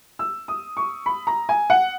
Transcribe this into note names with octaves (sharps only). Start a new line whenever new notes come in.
E6
D#6
C#6
B5
A#5
G#5
F#5